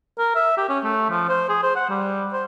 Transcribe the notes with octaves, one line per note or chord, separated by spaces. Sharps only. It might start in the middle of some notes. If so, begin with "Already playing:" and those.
A#4
E5
G4
C#4
A3
F3
C5
G#4
C5
F#5
G3
C5